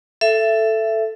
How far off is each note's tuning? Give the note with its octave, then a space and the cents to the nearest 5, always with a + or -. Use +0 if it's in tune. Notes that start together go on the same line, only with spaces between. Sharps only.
A4 +0 E5 +20